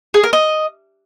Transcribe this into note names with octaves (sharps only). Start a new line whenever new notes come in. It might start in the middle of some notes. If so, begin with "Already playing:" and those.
G#4
A#4
D#5